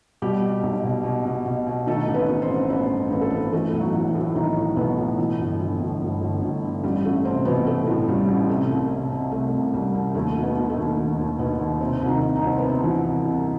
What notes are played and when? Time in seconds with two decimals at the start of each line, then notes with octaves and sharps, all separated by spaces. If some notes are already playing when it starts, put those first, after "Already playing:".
0.22 B2 G3 G4
0.42 B2
0.63 B1
0.84 B2
1.04 B2
1.25 B2
1.46 B2
1.67 B2
1.87 D#3 A3 A4
2.08 A1
2.14 B3 B4
2.28 D#3
2.42 C4 C5
2.50 A1
2.70 A1 B3 B4
2.90 G2
3.11 A1 B4
3.21 A4
3.30 A1 B3 B4
3.52 E3 A3 A4
3.73 B1
3.80 F#3 F#4
3.94 E3
4.08 E3 E4
4.15 A2
4.35 B1 D#3 D#4
4.57 A2
4.76 B1 B2 B3
4.97 A2
5.19 E3
5.38 G1
5.60 E3
5.80 G1
6.01 G1
6.21 G1
6.42 G1
6.63 G2
6.84 A1 G3
7.05 A1 A3
7.25 A1 C3 C4
7.45 B2 E3 B3
7.67 A2 A3
7.87 A2
8.08 A1 G3
8.29 A1
8.49 C3 A3
8.70 C2
8.91 C3
9.11 C3
9.32 C2 A3
9.53 C2
9.74 C2 G3
9.94 C2
10.14 D#2 A3
10.35 D#3
10.43 B2 B3
10.57 D#3
10.70 A3
10.77 D#2
10.97 D#3
11.18 D#2
11.39 D#2 B2 B3
11.59 D#2
11.80 C3 C4
12.02 C2
12.08 D#3 D#4
12.22 C2
12.36 D#4
12.42 C2 C4
12.58 C3 B3
12.69 C3 C4
12.84 E3
13.04 C2
13.25 C2